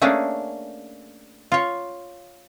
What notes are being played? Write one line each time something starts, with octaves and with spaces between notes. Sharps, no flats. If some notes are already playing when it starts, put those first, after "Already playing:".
A3 A#3 C#4 D4 G#4
F4 C#5